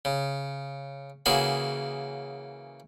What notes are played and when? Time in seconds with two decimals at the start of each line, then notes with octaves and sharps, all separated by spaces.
0.05 C#3
1.26 C#3 E3 A#3 F#4 G#4